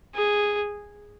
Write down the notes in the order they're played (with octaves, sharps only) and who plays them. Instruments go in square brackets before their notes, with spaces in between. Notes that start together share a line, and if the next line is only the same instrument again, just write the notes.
[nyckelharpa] G#4